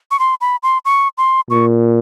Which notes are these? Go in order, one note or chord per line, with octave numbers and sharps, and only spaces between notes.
C#6
C6
B5
C6
C#6
C6
A#2 C#6